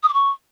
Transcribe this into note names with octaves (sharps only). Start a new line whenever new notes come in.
D#6
D6
C#6